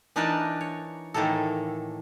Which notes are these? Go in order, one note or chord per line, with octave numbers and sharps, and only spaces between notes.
E3 D4 D#4 A#4 B4 A5
C#5
A2 D#3 E3 A#3 A4